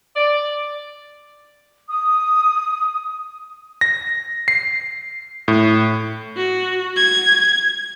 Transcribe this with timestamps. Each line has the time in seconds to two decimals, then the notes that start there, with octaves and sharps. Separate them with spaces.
0.16 D5
1.89 D#6
3.81 A#6
4.48 C7
5.48 A2
6.37 F#4
6.96 G#6